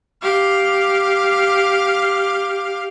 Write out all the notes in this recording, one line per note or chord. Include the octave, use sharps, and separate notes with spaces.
G4 F5